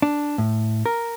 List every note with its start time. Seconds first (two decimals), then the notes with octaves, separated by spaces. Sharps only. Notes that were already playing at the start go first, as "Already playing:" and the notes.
0.02 D4
0.38 A2
0.86 A#4